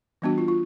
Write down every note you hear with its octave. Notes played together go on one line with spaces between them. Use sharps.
E3 G3 B3 D4 F#4
F4
F4